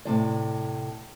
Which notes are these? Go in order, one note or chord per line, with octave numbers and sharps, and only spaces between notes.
A2 C3 F3 D5